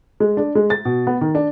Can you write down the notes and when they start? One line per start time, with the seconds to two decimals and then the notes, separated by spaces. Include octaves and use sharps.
0.20 G#3
0.37 D4
0.55 G#3
0.70 A6
0.85 B2
1.07 B3
1.21 D#3
1.35 D4